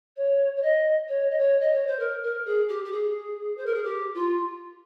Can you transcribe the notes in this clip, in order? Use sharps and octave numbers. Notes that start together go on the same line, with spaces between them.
C#5
C#5
D#5
C#5
D#5
C#5
D#5
C#5
C5
A#4
A#4
G#4
G4
G4
G#4
C5
A#4
G#4
G4
F4